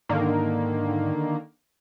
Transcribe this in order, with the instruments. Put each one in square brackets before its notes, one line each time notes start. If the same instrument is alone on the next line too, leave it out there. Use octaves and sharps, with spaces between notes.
[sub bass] G#2 [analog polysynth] D3 D#3 A#3